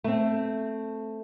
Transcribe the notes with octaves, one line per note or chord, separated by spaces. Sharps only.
A3 C4